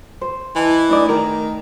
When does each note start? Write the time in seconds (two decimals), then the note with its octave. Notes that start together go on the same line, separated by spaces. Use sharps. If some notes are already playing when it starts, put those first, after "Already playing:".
0.21 C5
0.56 E3 D#5 A5
0.89 A3 D4 D#4 D5
1.09 D#3 A#4